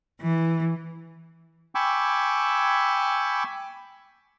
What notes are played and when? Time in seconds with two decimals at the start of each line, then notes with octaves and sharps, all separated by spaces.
0.21 E3
1.75 G5 G#5 B5 C#6 D6 E6